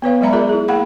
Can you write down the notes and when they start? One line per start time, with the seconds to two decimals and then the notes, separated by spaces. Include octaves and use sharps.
0.02 B3 B4 C#5 F5
0.21 F#3 G#3 D5 E5 A#5 B5
0.33 F4 G#4 A#4 D5
0.49 E4 G#4
0.68 A#3 G#4 F5 F#5 B5